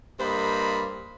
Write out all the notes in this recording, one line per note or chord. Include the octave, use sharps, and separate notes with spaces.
G2 A#3 C5 D#5 B5